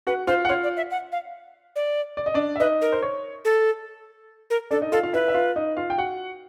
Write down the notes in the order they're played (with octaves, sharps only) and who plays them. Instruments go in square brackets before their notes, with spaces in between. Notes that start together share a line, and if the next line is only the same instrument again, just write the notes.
[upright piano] F#4 F#5 [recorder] B4
[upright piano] F4 F5 [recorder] C5
[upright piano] F#5
[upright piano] F4 F5 [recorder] C#5
[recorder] D5
E5
F#5
F5
D5
[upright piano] D5
D#5
D4 D5
E5
[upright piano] D#4 D#5 [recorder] B4
[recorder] A#4
[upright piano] C5
C#5
[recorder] A4
A#4
[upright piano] D4 D5 [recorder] A4
[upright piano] D#4 D#5
[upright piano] F4 F5 [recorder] A4
[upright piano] F4 F5
[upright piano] E4 E5 [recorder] B4
[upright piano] E5
F4 F5
D#4 D#5
F4 F5
G5
F#4 F#5